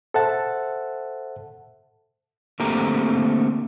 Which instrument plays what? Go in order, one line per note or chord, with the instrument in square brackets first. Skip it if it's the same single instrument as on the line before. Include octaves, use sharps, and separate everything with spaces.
[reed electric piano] A4 C5 E5 F#5 A5
[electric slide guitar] D3 A3 A#3 C4 G4 A#5